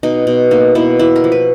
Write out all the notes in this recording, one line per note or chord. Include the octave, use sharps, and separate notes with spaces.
B2 D#4
B2
A#3 D#4
B2 E4
B3 E4
A#4
F3
B4